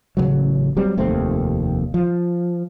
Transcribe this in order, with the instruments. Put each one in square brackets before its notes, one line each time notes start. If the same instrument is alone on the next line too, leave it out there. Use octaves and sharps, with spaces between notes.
[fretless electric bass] A1 C#3 F3 F#3
F#3 G3 C4
F1 D#2 A3 C4
F3